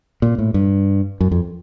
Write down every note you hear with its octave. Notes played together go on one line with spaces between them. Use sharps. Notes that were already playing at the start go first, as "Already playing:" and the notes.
A#2
A2
G2
F#2
F2